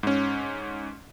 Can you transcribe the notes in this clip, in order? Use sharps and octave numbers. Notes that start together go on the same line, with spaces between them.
G#2 C#4